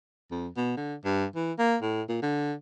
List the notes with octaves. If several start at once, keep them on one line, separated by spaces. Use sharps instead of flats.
F2
B2
D3
G2
E3
A#3
A2
A#2
D3